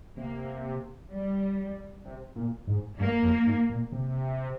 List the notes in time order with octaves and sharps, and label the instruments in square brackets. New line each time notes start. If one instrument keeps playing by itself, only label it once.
[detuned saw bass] C3 [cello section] A#3
[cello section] G3
[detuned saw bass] C3
A#2
G#2
[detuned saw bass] G2 [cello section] A#3
[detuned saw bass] F2
G#2
A#2
C3